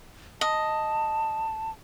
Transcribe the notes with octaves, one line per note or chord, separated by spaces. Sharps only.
D#5 A5